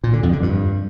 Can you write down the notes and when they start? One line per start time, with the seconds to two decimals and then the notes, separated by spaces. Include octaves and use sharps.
0.04 A#2
0.13 D3
0.23 F2
0.33 D3
0.42 G2